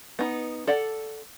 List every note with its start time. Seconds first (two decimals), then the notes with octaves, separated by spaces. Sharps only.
0.19 B3 D#4
0.67 A4 D5 F#5